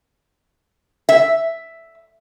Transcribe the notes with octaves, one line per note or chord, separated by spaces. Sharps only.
E5